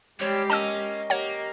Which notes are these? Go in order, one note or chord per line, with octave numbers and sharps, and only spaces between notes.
G3 G#3 C4 G4 C#5
A#3 C#4 D#5 A5 E6
A#3 G4 C#5 F#5